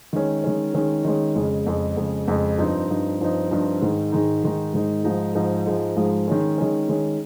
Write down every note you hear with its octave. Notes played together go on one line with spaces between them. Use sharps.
D#3 G#3 C#4
D#3 G#3 C#4
D#3 G#3 C#4
D#3 G#3 C#4
F2 C#3 G#3
F2 C#3 G#3
F2 C#3 G#3
F2 C#3 G#3
G2 F3 C4 D#4
G2 F3 C4 D#4
G2 F3 C4 D#4
G2 F3 C4 D#4
G#2 D#3 G#3 D#4
G#2 D#3 G#3 D#4
G#2 D#3 G#3 D#4
G#2 D#3 G#3 D#4
G#2 F3 G#3 D#4
G#2 F3 G#3 D#4
G#2 F3 G#3 D#4
G#2 F3 G#3 D#4
D#3 G#3 C#4
D#3 G#3 C#4
D#3 G#3 C#4